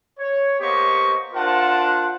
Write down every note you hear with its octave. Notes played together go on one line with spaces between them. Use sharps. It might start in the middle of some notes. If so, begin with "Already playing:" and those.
C#5
A#3 B3 G4 C5 D#5 C#6
D4 F4 A#4 C5 F#5 A5